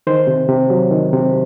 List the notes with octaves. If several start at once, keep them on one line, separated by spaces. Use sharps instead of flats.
D#3 C5
C3
C3
F#3
D#3
C3